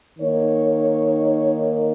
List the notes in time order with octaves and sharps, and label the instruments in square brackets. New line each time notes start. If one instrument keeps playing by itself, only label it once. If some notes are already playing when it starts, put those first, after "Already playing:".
[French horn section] D#3 A#3 D#4 C#5